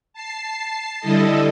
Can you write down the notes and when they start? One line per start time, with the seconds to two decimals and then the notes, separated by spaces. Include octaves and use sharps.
0.13 A5 C7
1.00 D3 G3 E4 A4 D#5